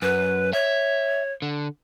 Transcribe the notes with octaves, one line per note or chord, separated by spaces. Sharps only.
F#2 B4
C#5 E5
D3